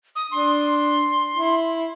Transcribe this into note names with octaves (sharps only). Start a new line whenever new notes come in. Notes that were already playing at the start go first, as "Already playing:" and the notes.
D#6
D4 C6
E4